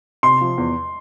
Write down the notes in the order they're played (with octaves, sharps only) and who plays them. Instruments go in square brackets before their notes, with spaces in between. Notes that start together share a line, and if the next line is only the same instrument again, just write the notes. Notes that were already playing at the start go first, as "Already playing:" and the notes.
[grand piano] C3 [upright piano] C6
[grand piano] F3
E2